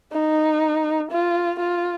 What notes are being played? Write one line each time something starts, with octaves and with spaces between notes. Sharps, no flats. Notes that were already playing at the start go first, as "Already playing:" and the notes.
D#4
F4
F4